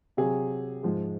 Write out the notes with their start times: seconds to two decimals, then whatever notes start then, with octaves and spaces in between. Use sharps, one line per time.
0.17 C3 F#3 G#4
0.83 G#2 F3 G#3